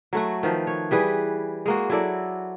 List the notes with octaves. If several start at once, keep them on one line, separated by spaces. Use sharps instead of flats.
F#3 A3 F#4
D#3 F3 B4
C#5
E3 G3 G#4 B4
G#3 A#3 F#4
F#3 E4 A4 D5